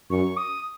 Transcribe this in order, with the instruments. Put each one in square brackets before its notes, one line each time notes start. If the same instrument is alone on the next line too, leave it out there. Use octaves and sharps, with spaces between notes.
[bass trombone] F#2 [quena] C#6
[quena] D#6